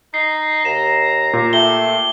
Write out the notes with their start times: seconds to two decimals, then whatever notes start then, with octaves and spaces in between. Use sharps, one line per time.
0.14 D#4 C7
0.65 D#2 A#5 E7
1.33 A#2
1.53 A3 G4 G7